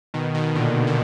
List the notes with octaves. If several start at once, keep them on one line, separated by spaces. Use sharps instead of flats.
B2 D#3
B2 D#3
A#2 D3
B2 D#3